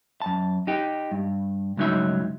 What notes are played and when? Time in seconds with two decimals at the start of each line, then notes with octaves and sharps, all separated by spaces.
0.22 F#2 A5
0.67 D#4 G4
1.12 G2
1.77 C#2 G2 F#3 D#4 E5